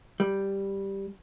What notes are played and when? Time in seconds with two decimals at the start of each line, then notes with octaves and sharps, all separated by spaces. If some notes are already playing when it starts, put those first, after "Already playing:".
0.20 G3